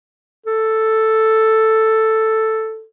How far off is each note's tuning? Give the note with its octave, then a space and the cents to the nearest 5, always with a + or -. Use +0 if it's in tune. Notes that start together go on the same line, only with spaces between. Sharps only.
A4 +5